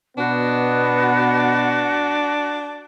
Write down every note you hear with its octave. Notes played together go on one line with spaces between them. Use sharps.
B2 B3 D4 F#4